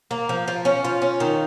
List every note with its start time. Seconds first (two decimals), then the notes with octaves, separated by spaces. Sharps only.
0.11 A#3
0.29 F3
0.48 F3
0.65 C#4
0.84 F4
1.02 C#4
1.20 D#3